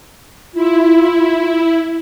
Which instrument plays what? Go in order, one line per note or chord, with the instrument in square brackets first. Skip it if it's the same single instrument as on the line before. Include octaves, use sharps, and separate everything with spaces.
[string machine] E4 [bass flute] F4